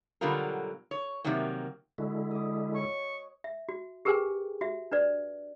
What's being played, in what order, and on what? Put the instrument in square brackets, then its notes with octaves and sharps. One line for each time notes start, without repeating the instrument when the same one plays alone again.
[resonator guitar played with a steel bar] B2 D3 F#3 G3 F4 A#4
C#5
C3 D#3 F#3 G3 A#3
[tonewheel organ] D3 G#3 E4 [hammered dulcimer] F#4
[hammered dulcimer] D#5 D6
[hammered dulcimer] C#5 [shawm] C#6
[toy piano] E5
F#4
G4 G#4 A#4 B4 G5 G#5
F#4 E5
D4 B4 D5